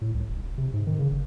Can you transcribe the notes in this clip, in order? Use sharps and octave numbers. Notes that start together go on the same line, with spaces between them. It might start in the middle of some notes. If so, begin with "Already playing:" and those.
A2
C2
E1
C3
G#2
D#3
C#3
F#1